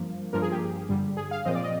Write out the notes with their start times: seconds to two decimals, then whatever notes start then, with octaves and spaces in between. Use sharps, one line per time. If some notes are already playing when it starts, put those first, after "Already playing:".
Already playing: G2 F3 A#3
0.33 G2 F3 A#3 A#4
0.42 G#4
0.52 G4
0.89 G2 D3 G3
1.17 G#4
1.31 F5
1.45 A#2 F3 C4 D#5
1.55 D5
1.64 D#5